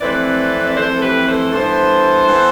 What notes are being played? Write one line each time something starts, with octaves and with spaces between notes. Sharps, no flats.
F2 E3 A3 C4 B4 D5
D5
F2 E3 A3 C4 A4 C5
A4
G4 B4
A4 C5
G2 E3 B3 A4 C5
E3 B3